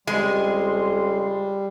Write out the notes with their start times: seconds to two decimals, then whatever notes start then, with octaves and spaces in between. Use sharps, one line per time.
0.07 F2 C#3 G3 G#3 C6